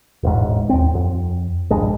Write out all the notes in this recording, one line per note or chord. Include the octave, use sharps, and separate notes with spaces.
E1 A1 G#2
D#2 C4
F2
D1 A#1 G2 G#3